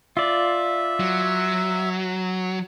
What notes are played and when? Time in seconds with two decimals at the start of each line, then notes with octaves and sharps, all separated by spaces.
0.17 F4 D5 E5
1.00 F#3